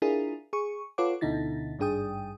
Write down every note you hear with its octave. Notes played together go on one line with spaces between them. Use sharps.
D4 E4 F4 G#4 A#4
G#4 C#6
F4 A4 B4 C#5 F#5 D6
D2 B2 D3 D#4 E4 A6
G#1 G2 D4 G#4 G5 D#6